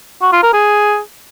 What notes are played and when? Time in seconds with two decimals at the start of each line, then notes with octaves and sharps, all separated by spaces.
0.22 F#4
0.32 F4
0.43 A#4
0.53 G#4